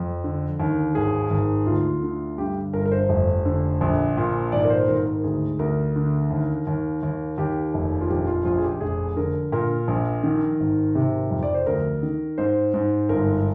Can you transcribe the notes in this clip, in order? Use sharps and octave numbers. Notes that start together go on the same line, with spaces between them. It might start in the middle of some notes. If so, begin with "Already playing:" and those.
Already playing: F2
D3
D#2
G#1 G#4
G#1
D2 F4
D3
G2 G4
G1 A#4
A#4
C5
F1
D3
A#1
A#2
G#1 D5
A#4
C5
G#1 A#4
A#4
D2 G#4
D2 A#4
D3
D#2
D#2
D#2
D#2 G4
F1
F4
A#1 G4
F4
A#1 F4
G#4
G4
F1 G#4
D3 A#4
A#2 A#4
A#1
D#3
G#1
C3
F2
D5
C5
D2 A#4
D#3
G#2 C5
G#2
G1 A#4